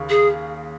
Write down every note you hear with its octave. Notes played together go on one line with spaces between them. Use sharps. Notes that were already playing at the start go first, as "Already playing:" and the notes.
Already playing: D#2 C#3
G#4